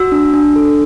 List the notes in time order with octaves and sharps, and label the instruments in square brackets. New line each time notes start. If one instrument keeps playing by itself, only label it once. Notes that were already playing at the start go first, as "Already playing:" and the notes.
Already playing: [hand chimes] F#4 E6
D4
D4
A4